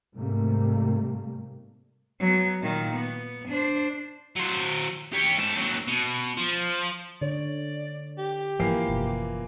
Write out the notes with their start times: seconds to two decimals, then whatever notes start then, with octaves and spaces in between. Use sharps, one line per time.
0.15 G#2 C3 G3 A3 A#3
2.19 F#3 B3
2.62 A#2 D#3
2.95 B3
3.48 D4 C5
4.36 F#3 C5
5.13 G4 C#5
5.38 G#2 A5
5.56 D#2 F#3
5.88 B2
6.37 F3
7.21 D3 C#5 D5
8.18 G4
8.60 G#2 E3 F3 A#3 C7
8.87 F#1 B2